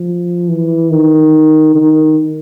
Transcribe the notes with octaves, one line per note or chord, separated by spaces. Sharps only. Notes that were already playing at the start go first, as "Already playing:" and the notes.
Already playing: F3
E3
D#3
D#3